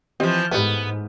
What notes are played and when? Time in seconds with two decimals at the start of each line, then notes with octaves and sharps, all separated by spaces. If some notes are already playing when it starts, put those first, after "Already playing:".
0.20 E3 F3 C4 G4 D#5
0.51 G#2 G3 A3 B3